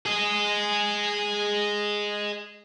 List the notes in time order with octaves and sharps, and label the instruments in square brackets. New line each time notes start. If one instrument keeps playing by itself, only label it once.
[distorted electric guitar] G#4 D#5